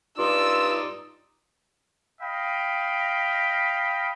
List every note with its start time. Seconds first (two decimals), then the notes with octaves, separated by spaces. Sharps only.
0.18 G2 D#4 F4 D5 E6
2.22 D#5 F5 G5 B5